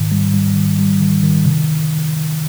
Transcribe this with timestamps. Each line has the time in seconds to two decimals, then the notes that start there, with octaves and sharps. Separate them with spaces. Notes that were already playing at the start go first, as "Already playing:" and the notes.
Already playing: G#2 D#3
0.12 G3
0.34 G3
0.56 D#3
0.79 G3
1.01 D#3
1.23 D#3
1.46 C3